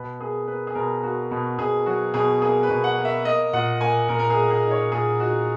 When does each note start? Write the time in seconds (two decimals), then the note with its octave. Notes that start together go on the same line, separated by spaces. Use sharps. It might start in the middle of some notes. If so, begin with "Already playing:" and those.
Already playing: B2 B4
0.20 A#3 G#4
0.47 A#3 B4
0.67 G#4
0.75 B2 A#4
1.03 A#3 F#4
1.31 B2 F#4
1.59 B2 G#4
1.86 F#3 F#4
2.14 B2 G#4
2.42 A#3 G#4
2.63 B4
2.70 B2
2.84 F#5
2.98 A#3
3.05 E5
3.25 A#3 D#5
3.53 A#2 F#5
3.81 A#3 G#5
4.09 A#2 A#4
4.19 A#4
4.30 G#4
4.37 A#3
4.50 G#4
4.65 D#4
4.71 C#5
4.92 A#2 G#4
5.20 D#4 F#4